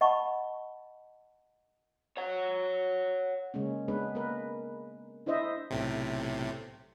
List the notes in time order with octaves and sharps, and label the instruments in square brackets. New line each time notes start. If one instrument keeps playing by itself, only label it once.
[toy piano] D#5 F#5 A5 B5 C#6
[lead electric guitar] C#5 F#5
[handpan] C#3 G#3 A#3 C#4
G#3 B3 D4 B4
A#3 A#4 B4
D4 E4 C5 D#5 E5
[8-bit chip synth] B1 A2 C3